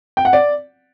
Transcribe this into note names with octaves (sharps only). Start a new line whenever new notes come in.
G5
F#5
D5